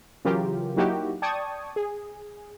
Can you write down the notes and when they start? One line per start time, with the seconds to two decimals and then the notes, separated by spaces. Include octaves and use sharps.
0.25 C#3 E3 F#3 F4 G4 A#4
0.77 F#3 A#3 D#4 E4 F#4 G4
1.22 D5 G5 A5 C#6 D#6 G#6
1.76 G#4